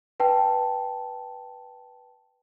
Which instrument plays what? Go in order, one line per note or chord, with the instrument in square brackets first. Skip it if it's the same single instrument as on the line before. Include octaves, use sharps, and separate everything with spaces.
[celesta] B4 G5 A5